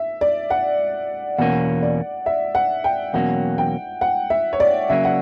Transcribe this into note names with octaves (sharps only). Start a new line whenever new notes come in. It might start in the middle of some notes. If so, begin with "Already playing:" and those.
Already playing: E5
D5
F#5
E2 B2 A#3 C#4 F#5
D5
E5
F#5
G5
E2 B2 F#3 A#3 C#4 F#5
G5
F#5
E5
C#5
D5
C#3 F#3 A#3 C#4 E5
F#5